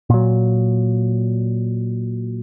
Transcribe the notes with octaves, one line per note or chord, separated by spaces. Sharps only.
A#2 F#3